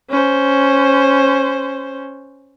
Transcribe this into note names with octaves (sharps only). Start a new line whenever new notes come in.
C#4 C5